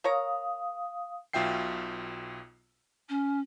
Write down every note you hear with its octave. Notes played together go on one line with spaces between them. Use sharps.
A#4 C#5 F5 A#5 D#6
B1 B2 F4 E5 G5 C7
C#4